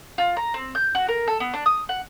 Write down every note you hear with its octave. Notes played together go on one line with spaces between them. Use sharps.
F4
A#5
C4
G6
F#4
A#4
A4
B3
D4
D#6
F#5